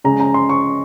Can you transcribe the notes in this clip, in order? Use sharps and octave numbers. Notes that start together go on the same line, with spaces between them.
C#3 G#3 C#4 A#5
A#5
C6
C#6